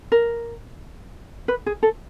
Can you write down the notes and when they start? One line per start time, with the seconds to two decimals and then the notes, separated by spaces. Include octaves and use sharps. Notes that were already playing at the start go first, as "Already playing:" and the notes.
0.12 A#4
1.48 B4
1.66 G#4
1.83 A4